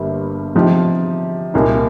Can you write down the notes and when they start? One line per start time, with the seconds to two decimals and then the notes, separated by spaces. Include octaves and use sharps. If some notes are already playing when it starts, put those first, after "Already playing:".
Already playing: G1 G2 G3 A#3
0.55 C3 F3 D#4 G4
1.54 C2 A#2 A#3 D#4